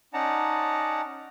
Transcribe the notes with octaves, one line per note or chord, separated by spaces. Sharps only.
C#4 D#4 D5 F#5 A5 A#5